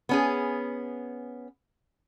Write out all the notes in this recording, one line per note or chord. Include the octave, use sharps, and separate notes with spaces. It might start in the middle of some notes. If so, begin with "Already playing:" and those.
B3 C#4 G#4